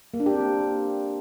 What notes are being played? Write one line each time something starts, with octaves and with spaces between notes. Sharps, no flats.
A#3
D4
G4
C4